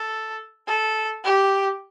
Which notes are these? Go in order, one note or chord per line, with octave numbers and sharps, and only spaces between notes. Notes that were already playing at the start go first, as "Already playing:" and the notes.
Already playing: A4
A4
G4